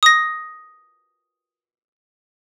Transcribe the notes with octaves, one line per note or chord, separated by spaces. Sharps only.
D#6 A#6